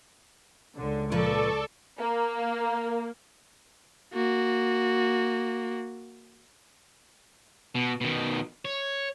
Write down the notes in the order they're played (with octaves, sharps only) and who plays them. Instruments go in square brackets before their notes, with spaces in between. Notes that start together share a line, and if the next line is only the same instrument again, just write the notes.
[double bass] C#2 [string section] D3
[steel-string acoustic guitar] A#2 F3 B4 [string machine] A4 [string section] D5 C#6
[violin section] A#3
[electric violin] A#3 F#4
[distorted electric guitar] B2
B2 D#3
C#5